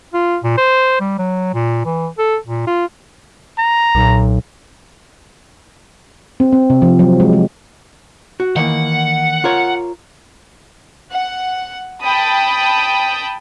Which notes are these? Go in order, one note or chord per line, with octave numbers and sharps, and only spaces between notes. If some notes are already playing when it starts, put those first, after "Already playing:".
F4
A#2
C5
G3
F#3
A#2
E3
A4
A#2
F4
A#5
B1 A#2
C4
C4
C3
F3
F#3
G#3
G#3
F#4
D#3 E3 A#3 F#5
F4 A#4 C#5
F#5
G5 A5 B5 D#6